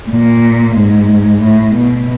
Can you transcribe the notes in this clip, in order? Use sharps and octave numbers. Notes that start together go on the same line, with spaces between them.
A#2
G#2
A2
B2